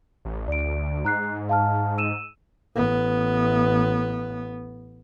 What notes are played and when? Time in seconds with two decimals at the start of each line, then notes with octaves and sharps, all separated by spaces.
0.25 A1
0.48 D2 D5 D7
1.05 G#2 A#5 F#6 C7
1.49 F5 A5 F6
1.98 E6 D#7 E7
2.76 A1 B3